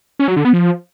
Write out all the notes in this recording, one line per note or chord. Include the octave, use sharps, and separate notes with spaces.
C#4
F#3
D3
B3
F3